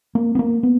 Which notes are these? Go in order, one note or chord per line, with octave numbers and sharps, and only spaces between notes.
A#3
B3
A#3
B3